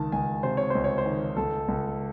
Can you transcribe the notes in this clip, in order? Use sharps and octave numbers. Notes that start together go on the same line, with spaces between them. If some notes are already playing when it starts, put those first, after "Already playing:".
Already playing: C#2 D#3 A5
C#2 G#5
C3 C5
C#5
C#2 C5
C#5
C5
D#3
C#2 A4
C#2